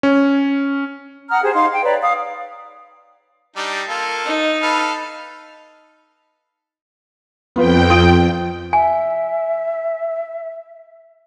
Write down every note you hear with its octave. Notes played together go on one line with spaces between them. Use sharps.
C#4
F#5 A#5 D#6 F6
G4 G#4 C5
D#4 F5 C6
G5
B4 C#5 D5 A#5
F5 D#6
G3 D4 D#4
A#3 F4 A4
D#4
A4 B4 F5
F2 B3 F4 B4 G5
F4 D#6 D7
E5 G#5